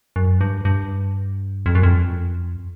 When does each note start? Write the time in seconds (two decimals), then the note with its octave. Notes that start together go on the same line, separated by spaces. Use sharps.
0.16 F#2
0.41 G2
0.65 G2
1.66 F2
1.75 F#2
1.83 F2